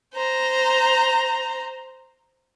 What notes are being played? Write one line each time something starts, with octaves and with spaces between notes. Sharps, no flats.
C5 A#5